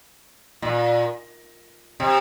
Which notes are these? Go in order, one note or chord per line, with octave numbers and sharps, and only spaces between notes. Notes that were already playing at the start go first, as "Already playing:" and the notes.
A#2
C3